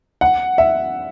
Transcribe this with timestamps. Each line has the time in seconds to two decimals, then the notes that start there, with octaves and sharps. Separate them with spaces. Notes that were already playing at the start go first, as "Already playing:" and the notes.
0.21 F#5
0.58 E5